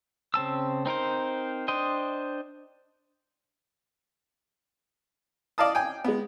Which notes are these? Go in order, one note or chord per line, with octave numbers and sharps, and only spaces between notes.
C#3 C4 A5 E6
C4 D#4 A#4 C5
D4 C5 D#5 G5
D5 D#5 F5 A5 D#6
G5 G#5
G#3 B3